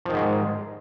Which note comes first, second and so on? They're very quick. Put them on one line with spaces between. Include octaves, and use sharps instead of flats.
F3 D#3 G#2 G#3